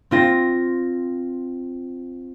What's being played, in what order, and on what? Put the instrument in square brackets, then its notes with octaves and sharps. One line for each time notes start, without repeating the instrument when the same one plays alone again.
[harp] C4 F4 A#6